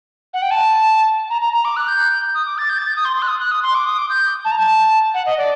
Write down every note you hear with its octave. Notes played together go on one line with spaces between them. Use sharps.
F#5
G5
A5
A#5
A#5
A#5
D6
F#6
G6
D#6
D6
A6
G6
A6
G6
D#6
C6
C6
F#6
D#6
F#6
D#6
C6
D6
D#6
D6
G6
A5
A#5
A5
F#5
D#5
D5